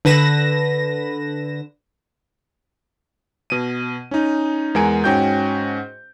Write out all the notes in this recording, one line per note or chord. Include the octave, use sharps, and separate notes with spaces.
D3 B4 A#6 E7
B2 D#7
C#4 D#4
E2 G#3 A#4 F#5 G#5 D7
G#2 C#4 F#4 G5 G6